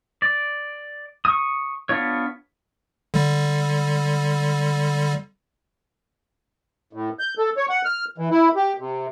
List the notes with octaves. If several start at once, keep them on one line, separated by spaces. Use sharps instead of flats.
D5
C#6 D#6
B3 D4 F4 C#5
D3 G3
A2
G6
A4
C#5
F#5
F6
E3
E4
G4
C3